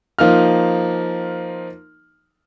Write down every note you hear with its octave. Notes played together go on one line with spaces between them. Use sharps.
F3 A#3 D#4 F6